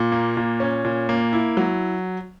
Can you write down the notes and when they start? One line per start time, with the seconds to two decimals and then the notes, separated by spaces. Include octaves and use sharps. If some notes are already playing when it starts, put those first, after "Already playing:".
Already playing: A#2
0.12 A#3
0.37 A#2
0.60 C#4
0.85 A#2
1.09 A#3
1.33 E4
1.57 F#3